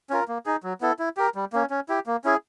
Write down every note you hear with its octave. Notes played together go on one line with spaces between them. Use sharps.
C#4 F4 A#4
A#3
D#4 G#4
F#3
B3 E4 A4
E4
G4 A#4
G3
A#3 C#4
C#4
E4 G4
A#3
C#4 E4 G#4